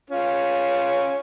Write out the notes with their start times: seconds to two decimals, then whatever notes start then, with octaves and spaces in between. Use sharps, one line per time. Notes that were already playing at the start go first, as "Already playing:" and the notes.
0.10 C#4 F4